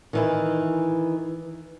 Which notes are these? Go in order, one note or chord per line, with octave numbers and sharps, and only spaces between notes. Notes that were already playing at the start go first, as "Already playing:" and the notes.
D#3 E3 E4